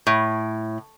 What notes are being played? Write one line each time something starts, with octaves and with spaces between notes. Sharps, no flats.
A2